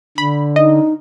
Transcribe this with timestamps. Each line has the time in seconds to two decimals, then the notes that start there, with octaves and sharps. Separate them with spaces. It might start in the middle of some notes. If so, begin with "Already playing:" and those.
0.18 D3 B5
0.56 D#4 D#5